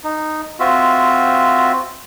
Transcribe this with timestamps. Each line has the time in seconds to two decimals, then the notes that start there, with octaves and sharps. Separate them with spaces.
0.04 D#4
0.60 C4 F4 F#4 E5